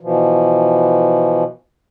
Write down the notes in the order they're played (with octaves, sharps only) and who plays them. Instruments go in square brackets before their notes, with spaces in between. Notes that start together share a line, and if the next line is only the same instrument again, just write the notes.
[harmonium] B2 E3 F3